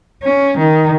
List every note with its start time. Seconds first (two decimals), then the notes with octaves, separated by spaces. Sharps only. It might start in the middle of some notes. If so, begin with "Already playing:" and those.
0.23 C#4
0.58 D#3